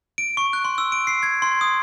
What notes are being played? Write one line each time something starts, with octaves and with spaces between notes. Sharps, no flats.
D7
C#6
F#6
C6
E6
D7
C7
G#6
C6
D#6